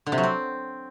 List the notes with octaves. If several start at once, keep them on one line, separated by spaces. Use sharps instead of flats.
D3
C3
F#3
C4